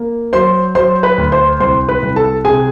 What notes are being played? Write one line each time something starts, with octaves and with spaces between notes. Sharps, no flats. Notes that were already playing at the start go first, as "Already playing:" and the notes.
Already playing: A#3
F#3 C5 C6
F#3 C5 C6
B4 B5
D2
C5 C6
C2 C5 C6
B4 B5
C2
A4 A5
C3 G#4 G#5